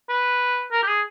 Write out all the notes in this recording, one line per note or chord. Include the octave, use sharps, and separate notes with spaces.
B4
A#4
G4
G#4